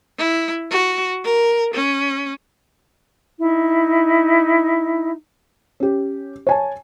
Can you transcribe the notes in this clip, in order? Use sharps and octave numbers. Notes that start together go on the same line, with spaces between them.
E4
F#4
A#4
C#4
D#4 E4
C#4 G4
C#5 G#5 A5